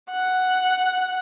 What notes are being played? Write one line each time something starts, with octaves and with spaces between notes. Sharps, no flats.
F#5